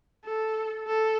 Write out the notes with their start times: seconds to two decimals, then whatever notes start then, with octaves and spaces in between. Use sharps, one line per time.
0.25 A4
0.87 A4